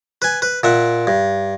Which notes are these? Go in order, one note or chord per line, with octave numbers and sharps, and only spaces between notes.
B4 G#5
B4
A#2 E5 F#5
G2